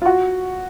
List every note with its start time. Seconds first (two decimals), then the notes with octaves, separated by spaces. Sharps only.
0.02 F4
0.05 F#4